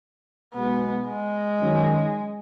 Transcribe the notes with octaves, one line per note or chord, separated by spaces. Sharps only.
B1 B2 G#3 B3
G#3
F#2 D#3 F#3 C#4